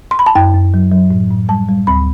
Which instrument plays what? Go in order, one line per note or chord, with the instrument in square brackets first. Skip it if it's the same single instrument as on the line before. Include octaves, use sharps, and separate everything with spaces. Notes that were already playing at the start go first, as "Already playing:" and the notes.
[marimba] C6
B5
A5
F#2 G5
F#2
F#3
F#3
A2
A2
G3 A5
G3
D2 B5